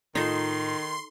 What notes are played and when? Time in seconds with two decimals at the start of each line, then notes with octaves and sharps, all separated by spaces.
0.15 A2 D#3 D#4 F4 A4 C6